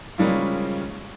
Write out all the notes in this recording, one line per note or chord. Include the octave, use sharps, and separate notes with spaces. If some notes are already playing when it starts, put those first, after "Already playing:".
C#3 F3 G3 G#3 A#3 C#4